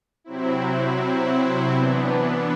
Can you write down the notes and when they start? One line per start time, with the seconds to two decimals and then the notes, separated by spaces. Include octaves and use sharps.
0.24 C3 F#3 C4 E4
1.73 E3 B3 D4